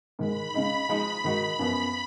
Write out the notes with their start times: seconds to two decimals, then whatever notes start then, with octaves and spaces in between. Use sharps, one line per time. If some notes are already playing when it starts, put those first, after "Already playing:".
0.19 G#2 D#3 G#3 B5
0.54 C#3 G#3 D#4
0.89 F3 G#3 D#4
1.24 G#2 D#3 G#3 D#4 F#4
1.59 F#2 F3 B3